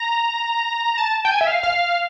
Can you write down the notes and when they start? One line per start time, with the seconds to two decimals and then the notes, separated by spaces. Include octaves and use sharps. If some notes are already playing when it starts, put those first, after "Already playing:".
Already playing: A#5
0.98 A5
1.25 G5
1.31 G#5
1.41 E5
1.47 F5
1.63 F5